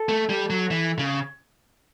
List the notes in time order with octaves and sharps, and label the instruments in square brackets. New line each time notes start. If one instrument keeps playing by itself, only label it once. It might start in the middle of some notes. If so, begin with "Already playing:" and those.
Already playing: [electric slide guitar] A4
[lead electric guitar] A3
G3
F#3
E3
C#3